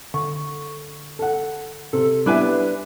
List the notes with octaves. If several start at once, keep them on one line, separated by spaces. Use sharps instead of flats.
D3 C#6
A4 F#5
C3 A4
G3 B3 D4 E4 B4 E5 G#5